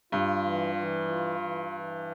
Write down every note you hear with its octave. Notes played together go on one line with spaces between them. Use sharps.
G2 F4
E3
E3
F4
E3
E3